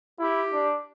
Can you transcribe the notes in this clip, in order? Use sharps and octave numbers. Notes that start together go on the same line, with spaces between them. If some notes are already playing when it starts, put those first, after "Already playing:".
E4 G4
D4